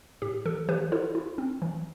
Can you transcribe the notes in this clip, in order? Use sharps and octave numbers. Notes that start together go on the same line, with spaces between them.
A2 G4
E3 A4
E3 G4 B4
E4 A4 C5
E4
C4
E3